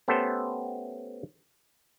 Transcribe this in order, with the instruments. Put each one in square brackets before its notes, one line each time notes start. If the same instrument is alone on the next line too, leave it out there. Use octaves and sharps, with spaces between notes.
[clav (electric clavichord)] A3 B3 C#4 G4 A4 C5